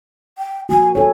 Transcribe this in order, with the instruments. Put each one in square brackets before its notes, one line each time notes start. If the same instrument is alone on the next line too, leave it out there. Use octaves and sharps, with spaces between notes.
[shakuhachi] G5
[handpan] F3 A#3 F#4 [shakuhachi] G#5
[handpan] A4 C#5 [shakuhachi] G#5